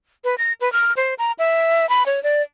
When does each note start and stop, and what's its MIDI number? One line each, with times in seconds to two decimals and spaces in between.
0.24 0.35 71
0.38 0.53 94
0.61 0.72 71
0.73 0.93 89
0.97 1.14 72
1.19 1.32 82
1.39 1.89 76
1.89 2.03 83
2.06 2.22 73
2.23 2.42 74